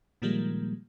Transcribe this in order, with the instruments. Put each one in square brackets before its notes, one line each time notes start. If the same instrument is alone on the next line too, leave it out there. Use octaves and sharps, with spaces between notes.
[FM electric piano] A#2 D#3 F3 G3 G#3 A#3